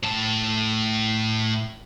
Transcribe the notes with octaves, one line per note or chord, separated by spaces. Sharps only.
A2 A5